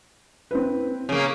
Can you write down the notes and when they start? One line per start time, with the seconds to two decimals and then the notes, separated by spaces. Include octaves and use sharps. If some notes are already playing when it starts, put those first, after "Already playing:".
0.51 C4 E4 B4
1.09 C#3 A#3